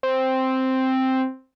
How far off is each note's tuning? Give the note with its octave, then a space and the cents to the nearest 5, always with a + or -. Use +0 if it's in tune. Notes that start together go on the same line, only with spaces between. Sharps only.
C4 +0